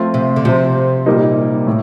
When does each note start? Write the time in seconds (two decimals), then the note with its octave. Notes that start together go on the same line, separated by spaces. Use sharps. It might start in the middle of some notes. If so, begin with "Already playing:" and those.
Already playing: F3 A3 C4 F4
0.14 C3
0.36 D3
0.45 C3 F3 C4 F4
1.06 A#2 G3 A#3 D#4
1.67 A2